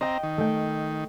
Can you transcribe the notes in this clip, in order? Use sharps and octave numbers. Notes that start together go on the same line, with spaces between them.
C4 D#5 G5 A#5
D#3
A3 G5